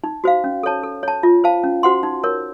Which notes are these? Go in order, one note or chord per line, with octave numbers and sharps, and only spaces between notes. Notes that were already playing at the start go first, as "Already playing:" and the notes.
D#4
F#4 C5 F5
C#4
A4 C#5 A5
A4
C#5 A5
F4
C5 F5 A5
C#4
F#4 C5 F#5 C6
D#4
A#4 C#5